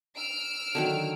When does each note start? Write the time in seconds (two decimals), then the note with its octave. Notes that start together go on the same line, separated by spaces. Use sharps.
0.17 E6 F6 D7
0.75 D3 D#3 F#3